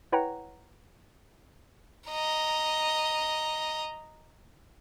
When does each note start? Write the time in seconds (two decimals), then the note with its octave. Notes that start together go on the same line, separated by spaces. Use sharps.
0.12 E4 B4 C#5 F#5 G5 A#5
2.08 D#5 A#5